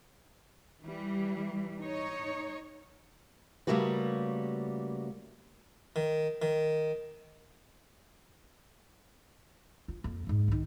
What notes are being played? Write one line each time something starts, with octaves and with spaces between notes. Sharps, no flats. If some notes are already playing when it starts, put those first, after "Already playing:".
E3 G3
D#4 C#5
C#3 G3 A3 A#3 F#4 B4
D#3
D#3
F4
F2 A#3
F2 G#2
C2 D#3